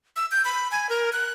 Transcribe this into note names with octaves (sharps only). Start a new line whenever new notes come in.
E6
G6
B5
G#5
A#4
F#6